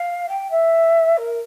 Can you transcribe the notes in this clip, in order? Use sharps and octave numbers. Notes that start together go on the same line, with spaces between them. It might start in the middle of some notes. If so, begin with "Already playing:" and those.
Already playing: F5
G5
E5
A#4